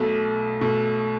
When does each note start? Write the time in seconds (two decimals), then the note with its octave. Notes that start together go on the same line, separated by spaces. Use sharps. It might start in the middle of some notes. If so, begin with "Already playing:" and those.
Already playing: B1 B2 A3
0.61 B2 A3